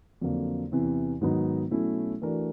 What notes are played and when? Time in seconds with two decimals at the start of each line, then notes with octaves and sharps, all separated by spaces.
0.21 F2 D3 F#3 A#3
0.72 E2 C3 E3
1.21 G#2 D#3 F#3 B3 D#4
1.71 B2 F#3 A3 C#4 E4
2.22 E3 A3 D4 F#4 A#4